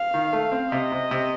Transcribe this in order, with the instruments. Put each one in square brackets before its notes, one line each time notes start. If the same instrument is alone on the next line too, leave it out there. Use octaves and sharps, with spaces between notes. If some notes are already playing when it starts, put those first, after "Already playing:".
Already playing: [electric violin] F5
[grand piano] D#3
A3
C4
[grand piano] C3 [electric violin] D#5
[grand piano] C3
C3